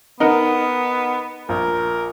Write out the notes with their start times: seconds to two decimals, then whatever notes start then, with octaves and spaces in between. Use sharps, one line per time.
0.20 B3 D#4 A#4 F#5
1.49 A#1 A#4